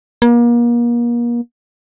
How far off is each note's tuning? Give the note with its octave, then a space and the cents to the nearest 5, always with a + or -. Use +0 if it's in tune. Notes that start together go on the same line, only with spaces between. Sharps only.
A#3 +35